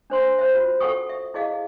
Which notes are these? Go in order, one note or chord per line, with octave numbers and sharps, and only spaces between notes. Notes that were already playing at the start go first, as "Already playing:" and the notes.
D4 C5 C6
C5 E5
F4 F#4
A4 F#5 G5 C#6 D#6
E5
E4 G#4 D#5 F5